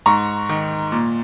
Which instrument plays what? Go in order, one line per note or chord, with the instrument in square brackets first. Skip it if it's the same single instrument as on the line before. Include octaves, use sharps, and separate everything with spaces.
[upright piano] G#2 A#5 C#6
D#3
A#2